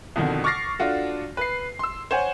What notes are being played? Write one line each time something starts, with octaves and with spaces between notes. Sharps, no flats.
F2 B2 D3 D#3
C#6 D6 F6 A6 A#6 C7
D4 F4 F#4 A4
B4 C7
C6 E6
C5 C#5 F#5 G#5